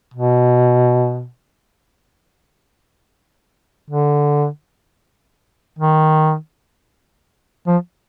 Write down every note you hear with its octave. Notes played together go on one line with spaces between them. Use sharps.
B2
D3
D#3
F3